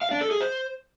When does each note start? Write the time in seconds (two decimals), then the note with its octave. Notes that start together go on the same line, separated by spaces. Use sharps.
0.01 F5
0.11 D4
0.21 A4
0.31 G#4
0.41 C5